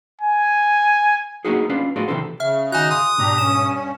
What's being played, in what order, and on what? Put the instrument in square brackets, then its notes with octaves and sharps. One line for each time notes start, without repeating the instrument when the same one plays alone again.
[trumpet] G#5
[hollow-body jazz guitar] A#3 B3 D4 D#4 F#4 G#4
C#4 D4 F4 B4 F5
A2 B3 D4 F4 F#4 G#4
C3 E3 G3 D4 A4 C5
[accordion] C#3 [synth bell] E5 F6
[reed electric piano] D#3 F#4 [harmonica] D#4 [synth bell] G#5 F#6
[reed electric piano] C6 [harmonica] D#6
[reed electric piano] G#2 B2 [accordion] D4 G4 A#5
[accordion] G2 C#4 [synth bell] E7